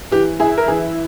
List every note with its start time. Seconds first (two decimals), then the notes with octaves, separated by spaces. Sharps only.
0.11 E3 G4
0.40 E4 G#4
0.58 A#4
0.68 E3 G#4